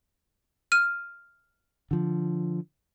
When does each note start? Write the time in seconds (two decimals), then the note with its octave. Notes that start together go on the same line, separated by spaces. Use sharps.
0.72 F6 D#7
1.91 D3 F3